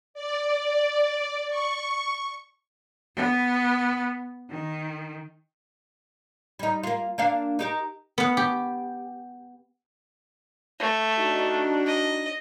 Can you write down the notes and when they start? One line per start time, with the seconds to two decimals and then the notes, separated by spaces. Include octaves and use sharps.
0.14 D5
1.49 C#6
3.16 B3
4.50 D#3
6.59 G3 D#4
6.83 A#3 F4
7.18 A#3 D4 F5
7.59 D#4 G4 A#4
8.18 B3 F#5
8.37 G4
10.80 A3
11.19 D4 D#4 F#4
11.86 D#5